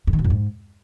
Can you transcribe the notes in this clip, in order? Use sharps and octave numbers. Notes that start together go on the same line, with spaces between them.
G2
D#3
B2
F2
G#2